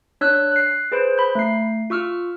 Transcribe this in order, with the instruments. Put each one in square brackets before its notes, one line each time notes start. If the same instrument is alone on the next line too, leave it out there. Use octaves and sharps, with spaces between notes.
[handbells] D4 C#5 E6 F#6
F#6 C7
G#4 B4 C5
B5 G6
A3 C7
F4 C#6 E6 F6